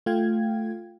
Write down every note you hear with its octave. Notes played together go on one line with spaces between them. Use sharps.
A3 F4 F5 G5 G#6